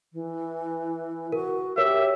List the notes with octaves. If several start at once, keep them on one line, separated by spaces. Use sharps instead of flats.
E3
F#4 A#4
G4 A#4 C#5 E5